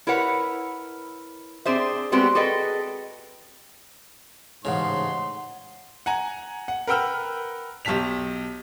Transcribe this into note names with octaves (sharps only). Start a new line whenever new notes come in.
E4 A#4 B4 C#5 F#5
C4 D4 G#4 C5 E5
G3 G#3 B3 C4 F#4 G4
F#4 G#4 A4 B4 D#5 G5
A1 G#2 C#3 D#5 F#5 C6
F#5 G#5 A#5
F#5
A#4 B4 F#5 G5 E6 F6
B1 G4 A5 B6 F7